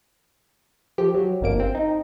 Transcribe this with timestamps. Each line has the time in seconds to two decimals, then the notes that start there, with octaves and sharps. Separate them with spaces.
0.98 F3 G4
1.14 F#3
1.41 G1 F2 A#3 D7
1.60 C4
1.75 D#4